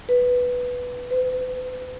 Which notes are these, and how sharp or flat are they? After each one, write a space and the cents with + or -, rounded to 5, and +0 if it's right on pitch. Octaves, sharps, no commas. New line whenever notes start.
B4 +0
B4 +45